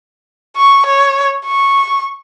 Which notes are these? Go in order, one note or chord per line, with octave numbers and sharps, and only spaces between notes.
C#6
C#5
C#6